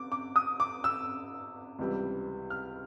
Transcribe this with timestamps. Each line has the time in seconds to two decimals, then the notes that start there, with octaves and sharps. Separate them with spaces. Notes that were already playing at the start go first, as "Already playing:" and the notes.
Already playing: D6
0.12 D6
0.36 D#6
0.60 D6
0.84 E6
1.79 C#2 C3 E3 G3
2.50 F6